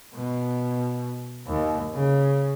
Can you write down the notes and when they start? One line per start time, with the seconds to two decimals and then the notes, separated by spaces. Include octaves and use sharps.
0.14 B2
1.47 D#2
1.94 C#3